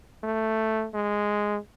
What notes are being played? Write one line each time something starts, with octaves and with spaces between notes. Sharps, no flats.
A3
G#3